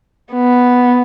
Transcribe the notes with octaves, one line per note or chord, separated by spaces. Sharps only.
B3